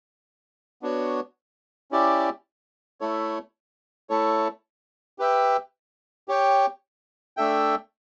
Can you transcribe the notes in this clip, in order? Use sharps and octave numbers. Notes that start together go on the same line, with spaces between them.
B3 D4 F#4 C#5
C#4 E4 G4 D5
A3 E4 A4 C#5
A3 E4 A4 C#5
G4 B4 E5 G5
G4 C#5 G5
A3 D4 A4 E5 G5